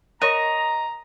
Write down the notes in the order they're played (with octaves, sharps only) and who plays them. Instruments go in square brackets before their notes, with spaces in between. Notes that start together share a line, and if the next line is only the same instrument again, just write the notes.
[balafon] A#4 C#5 [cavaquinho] D#5 C#6 [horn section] A#5